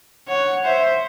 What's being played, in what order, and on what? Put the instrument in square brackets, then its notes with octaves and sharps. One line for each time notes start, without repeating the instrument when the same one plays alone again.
[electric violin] C#5 [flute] F#5
[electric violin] C5 [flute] E5